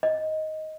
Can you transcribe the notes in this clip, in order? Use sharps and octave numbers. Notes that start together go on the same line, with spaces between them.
D#5